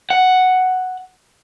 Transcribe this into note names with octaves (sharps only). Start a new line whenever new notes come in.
F#5